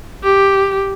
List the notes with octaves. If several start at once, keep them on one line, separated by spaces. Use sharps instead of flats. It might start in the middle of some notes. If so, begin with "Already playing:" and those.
G4